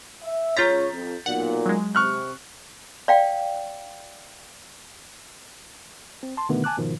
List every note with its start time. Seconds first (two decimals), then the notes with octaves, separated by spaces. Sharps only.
0.23 E5
0.57 C#2 F4 C#5 A#5 G6 A6 B6
0.93 F2
1.26 B1 A#2 F#5
1.66 F#3 G#3
1.95 C3 C#6 F6 F#6
3.08 D5 F5 G5
6.23 C4
6.37 A5 C6
6.49 G1 B2 D3 D#3 A3 B3
6.64 G#5 A5 D6 F#6
6.77 G#2 B2 D#3 F3